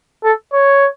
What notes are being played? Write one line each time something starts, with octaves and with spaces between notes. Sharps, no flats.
A4
C#5